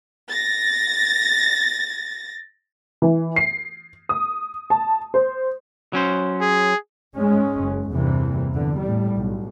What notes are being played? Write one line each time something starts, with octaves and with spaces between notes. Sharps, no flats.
A6 A#6
E3
C7
D#6
A5
C5
F#3 C#4 C5
G#4
G#2 G#3 C#4
F#1
E2 G2 C3 E3 A#3
E2 D3
A2 G3
B1